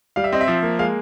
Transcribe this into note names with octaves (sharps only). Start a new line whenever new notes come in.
G3 F5
E5
C4 D#5
E5
F3
A#3
G#3 F5